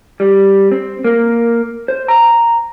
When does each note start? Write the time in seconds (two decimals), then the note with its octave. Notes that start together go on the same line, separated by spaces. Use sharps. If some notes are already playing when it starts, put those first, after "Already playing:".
0.20 G3
0.71 C4
1.04 A#3
1.88 C5
2.08 A#5